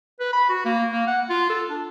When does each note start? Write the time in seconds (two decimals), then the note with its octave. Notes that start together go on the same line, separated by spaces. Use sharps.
0.20 B4
0.33 B5
0.49 F#4
0.65 A#3
0.92 A#3
1.07 F#5
1.30 F4
1.50 A4
1.70 D4